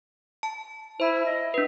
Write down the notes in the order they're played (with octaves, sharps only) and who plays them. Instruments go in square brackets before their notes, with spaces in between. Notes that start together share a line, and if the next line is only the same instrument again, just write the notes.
[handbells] A5
[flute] E4 [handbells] C5 B5
[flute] D#5
[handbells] D4 B4